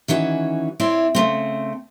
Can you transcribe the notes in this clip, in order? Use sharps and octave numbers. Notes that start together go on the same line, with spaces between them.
D#3 E3 C#4 F#4
C4 E4 C#5 D5
C#3 A3 C4